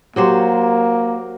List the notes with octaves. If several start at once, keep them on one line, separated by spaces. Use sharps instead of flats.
F#3 A#3 G4 C5